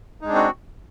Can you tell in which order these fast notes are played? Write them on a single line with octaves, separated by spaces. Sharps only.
D#4 G#3 D4 C4 F#4